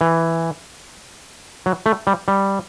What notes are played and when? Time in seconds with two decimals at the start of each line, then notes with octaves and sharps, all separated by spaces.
0.01 E3
1.66 F#3
1.86 A3
2.07 G3
2.28 G3